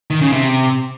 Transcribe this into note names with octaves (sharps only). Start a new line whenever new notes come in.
D#3
C#3
C3